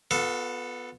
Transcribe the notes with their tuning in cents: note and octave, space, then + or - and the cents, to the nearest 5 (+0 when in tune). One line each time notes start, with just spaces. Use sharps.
B3 +0 F4 +40 A4 +0